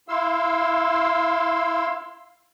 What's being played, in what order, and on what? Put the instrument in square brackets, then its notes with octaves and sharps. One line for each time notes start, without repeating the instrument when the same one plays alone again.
[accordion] E4 F5 C6 E6